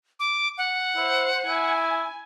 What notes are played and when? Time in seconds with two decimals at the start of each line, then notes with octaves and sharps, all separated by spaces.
0.20 D6
0.58 F#5
0.96 E4 C5
1.46 E4 G#5